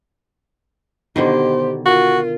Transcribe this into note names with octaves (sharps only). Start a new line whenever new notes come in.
B2 D3 D#3 B3 G4 C5 C6
F4 F#4 A#4